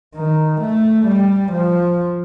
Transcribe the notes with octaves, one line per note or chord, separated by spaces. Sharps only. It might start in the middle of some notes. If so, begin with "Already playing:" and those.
D#3
A3
G3
F3